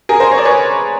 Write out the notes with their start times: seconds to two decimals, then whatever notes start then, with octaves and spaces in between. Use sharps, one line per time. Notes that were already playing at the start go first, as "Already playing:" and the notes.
0.09 G#4 A#4
0.20 A#4 C5
0.31 C#5
0.38 D5
0.45 B4 C#5